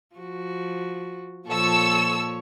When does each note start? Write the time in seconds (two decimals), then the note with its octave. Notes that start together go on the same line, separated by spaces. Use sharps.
0.16 F3 F#4
1.48 A#2 F3 A4 C#5 C#6 E6